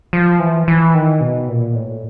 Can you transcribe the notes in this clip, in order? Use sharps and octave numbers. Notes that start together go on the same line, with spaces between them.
F3
E3
E3
D#3
B2
A#2
A2